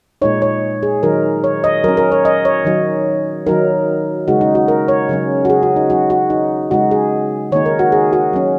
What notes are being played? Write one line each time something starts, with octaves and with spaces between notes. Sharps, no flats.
A#2 G#3 D#4 C#5
C#5
G#4
D#3 F#3 D#4 A#4
C#5
D#5
F#3 C#4 A#4
A#4
C#5
D#5
C#5
D#3 F#3 D#4
D#3 F#3 D#4 A#4
C#3 G#3 D#4 F#4
D#4
F#4
A#4
C#5
C#3 F#3 C#4
F#4
G#4
F#4
D#4
F#3 D#4 F#4
F#4
D#4
C#3 G#3 D#4 F#4
G#4
D#3 A#3 D#4 C#5
A#4
F#4
G#4
F#4
F#3 C#4